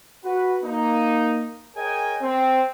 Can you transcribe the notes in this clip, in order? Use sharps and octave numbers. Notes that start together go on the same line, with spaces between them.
F#4 B4
A#3 D#4
G#4 A#4 C#5 D#5 G5 G#5
C4